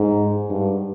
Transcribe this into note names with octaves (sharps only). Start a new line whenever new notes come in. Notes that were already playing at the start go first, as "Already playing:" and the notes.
Already playing: G#2
G2